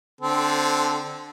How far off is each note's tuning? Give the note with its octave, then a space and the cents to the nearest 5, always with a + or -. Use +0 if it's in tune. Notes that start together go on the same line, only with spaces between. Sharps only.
D3 +10 C4 +0 A4 -20